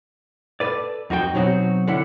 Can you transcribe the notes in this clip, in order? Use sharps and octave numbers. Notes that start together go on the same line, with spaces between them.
A4 B4 D5
F2 D#4 F#4 A4 G5
B2 F#3 C4 D#4 F#4
D3 C#4 E4 E5 F#5